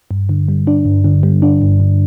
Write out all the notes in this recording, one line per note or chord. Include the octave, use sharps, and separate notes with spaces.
G2
D3
G3
D4
G2
D3
G3
D4
G2
D3